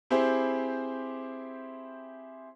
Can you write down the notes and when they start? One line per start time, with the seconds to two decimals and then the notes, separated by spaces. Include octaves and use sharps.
0.11 C4 E4 G4 G#4 C5